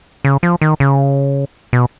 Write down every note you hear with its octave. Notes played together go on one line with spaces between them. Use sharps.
C#3
F3
D#3
C#3
B2